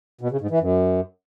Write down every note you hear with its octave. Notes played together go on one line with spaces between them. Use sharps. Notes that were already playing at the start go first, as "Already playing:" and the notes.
B2
C#3
G#2
E3
F#2